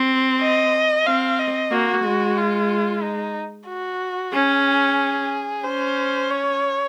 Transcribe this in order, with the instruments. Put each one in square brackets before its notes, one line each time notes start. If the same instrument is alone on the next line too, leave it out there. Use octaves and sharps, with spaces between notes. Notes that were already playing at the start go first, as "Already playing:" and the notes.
Already playing: [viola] C4
[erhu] D#5
[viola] C4 [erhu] F5
[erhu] D#5
[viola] A#3 [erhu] F#4
[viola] G#3
[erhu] F4
D#4
F#4
[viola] C#4 [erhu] G#4
[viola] C#4 [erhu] C5
[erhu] C#5